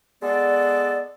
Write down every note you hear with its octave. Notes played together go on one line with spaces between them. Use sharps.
G#3 B3 A4 D5